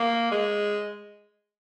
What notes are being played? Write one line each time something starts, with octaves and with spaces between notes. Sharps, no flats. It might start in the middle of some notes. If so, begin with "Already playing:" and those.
Already playing: A#3
G#3